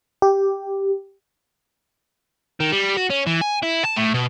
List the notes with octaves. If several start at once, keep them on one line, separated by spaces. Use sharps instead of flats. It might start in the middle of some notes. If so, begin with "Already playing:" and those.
G4
D#3
G3
F#4
C#4
E3
G#5
E4
A5
A2
B2